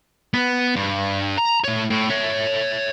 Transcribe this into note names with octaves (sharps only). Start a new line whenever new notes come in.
B3
G2
A#5
A3 C#5
A2
C#5 E5